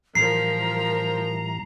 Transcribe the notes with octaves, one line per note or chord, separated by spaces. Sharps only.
A2 E3 F3 G3 A#4 A#5 C7